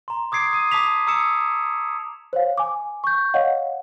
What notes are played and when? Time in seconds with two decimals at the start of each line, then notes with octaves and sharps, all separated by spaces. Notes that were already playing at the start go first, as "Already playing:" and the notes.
0.08 A#5 C6
0.32 D6 D#6 G#6 C7 D7
0.53 D#6 D#7
0.71 A5 D6 D#6 B6 F7
1.07 A#5 D#6 E6 C#7 E7
2.33 C5 C#5 F5
2.58 G#5 D6
3.04 C#6 G6
3.34 C#5 D#5 F5 F#5